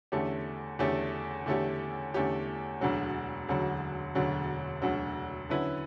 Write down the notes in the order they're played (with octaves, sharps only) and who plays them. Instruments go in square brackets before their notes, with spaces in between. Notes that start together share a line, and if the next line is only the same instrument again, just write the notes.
[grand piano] E2 D3 A3 C#4 G4
E2 D3 A3 C#4 G4
E2 D3 A3 C#4 G4
E2 D3 A3 C#4 G4
E1 D2 D3 F#3
E1 D2 D3 F#3
E1 D2 D3 F#3
E1 D2 D3 F#3
D3 F#3 C#4 E4 B4